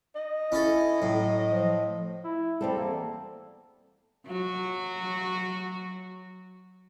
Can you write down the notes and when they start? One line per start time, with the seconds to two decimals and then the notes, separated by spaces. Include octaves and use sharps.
0.16 D#5
0.52 C#4 E4 A4
1.02 A2 F#3
1.50 F3
2.24 E4
2.61 E2 G3 C4 A4
2.77 A#3
4.27 F#3 F#4